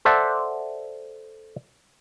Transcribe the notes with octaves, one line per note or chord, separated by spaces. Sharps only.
A4 C5 D5 E5 F#5 A5